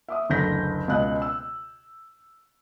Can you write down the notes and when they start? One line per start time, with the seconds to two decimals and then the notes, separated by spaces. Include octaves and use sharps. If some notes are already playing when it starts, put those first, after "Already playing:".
0.09 E5 D6 D#6
0.29 F#1 D2 E3 G6 A#6 B6
0.88 C#2 B2 C#4 D#5 F#6
1.22 E6